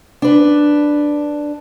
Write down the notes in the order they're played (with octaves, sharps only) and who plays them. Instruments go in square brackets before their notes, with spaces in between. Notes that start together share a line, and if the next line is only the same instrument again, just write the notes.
[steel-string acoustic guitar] D4 B4